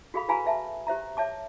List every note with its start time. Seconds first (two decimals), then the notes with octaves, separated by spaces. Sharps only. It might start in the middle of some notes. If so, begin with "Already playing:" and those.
0.14 F#4 G#4 A4 F5 B5
0.28 G#4 B4 F5 G#5 A#5 B5
0.45 B4 E5 A5
0.87 G4 C5 E5 A#5
1.17 C#5 E5 A5 D6